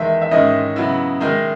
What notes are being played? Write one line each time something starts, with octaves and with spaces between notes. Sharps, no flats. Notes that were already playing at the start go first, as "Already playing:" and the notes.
Already playing: E2 D#3 G#3 E5
E5
G#2 D#3 G#3 C#4 D#5
C#3 F#3 B3 E4
D#3 G#3 D#4